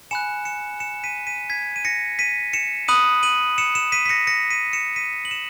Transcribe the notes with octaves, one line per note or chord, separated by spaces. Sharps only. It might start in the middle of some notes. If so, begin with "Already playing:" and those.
G#5 B5 F#6 C#7 E7
C#7 E7
C#7 E7
B6 D#7
B6 D#7
G#6 B6
D#7
A#6 C#7
B6 D#7
C#7 E7
B5 D#6 F#6 D#7 F#7
D#7 F#7
C#7 E7
C#7 E7
B6 D#7
B6
A#6 C#7
A#6 C#7
B6 D#7
C#7 E7
B6 D#7
F#7
C#7 E7